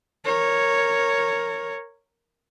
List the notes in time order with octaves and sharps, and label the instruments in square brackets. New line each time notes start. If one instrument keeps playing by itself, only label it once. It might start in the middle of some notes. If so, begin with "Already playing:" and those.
[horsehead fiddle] A#4 C#5